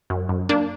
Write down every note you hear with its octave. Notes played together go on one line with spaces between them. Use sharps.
F#2
F#2
A#3 D4